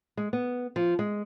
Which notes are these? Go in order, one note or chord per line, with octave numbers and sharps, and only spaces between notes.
G#3
B3
F3
G#3